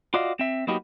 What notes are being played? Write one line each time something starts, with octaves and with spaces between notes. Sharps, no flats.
F4 F#4 D5 D#5 F5
C4 E5
F#3 A#3 B3 D#4 F#4 G4